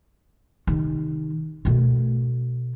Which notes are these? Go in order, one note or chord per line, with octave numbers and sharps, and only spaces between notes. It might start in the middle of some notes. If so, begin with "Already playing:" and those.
C3 D#3
B2 A3